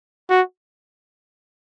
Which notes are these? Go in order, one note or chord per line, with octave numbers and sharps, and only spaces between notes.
F#4